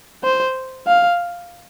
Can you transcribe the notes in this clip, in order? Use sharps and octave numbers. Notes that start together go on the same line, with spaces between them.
C5
F5